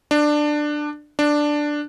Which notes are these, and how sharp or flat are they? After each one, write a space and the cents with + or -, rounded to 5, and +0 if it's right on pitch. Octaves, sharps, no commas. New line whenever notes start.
D4 +15
D4 +5